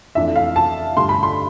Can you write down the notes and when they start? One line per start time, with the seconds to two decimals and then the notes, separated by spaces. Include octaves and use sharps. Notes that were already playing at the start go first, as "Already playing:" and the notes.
0.15 F2 E3 A3 D4 E5
0.36 F5
0.56 A5
0.97 G2 D3 A3 C6
1.09 B5
1.23 C6